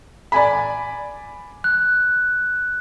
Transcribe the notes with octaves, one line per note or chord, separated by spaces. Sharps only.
D5 G#5 B5
F#6